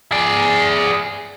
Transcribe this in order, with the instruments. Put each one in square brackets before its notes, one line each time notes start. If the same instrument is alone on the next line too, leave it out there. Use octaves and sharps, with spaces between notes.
[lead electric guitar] G#4 D5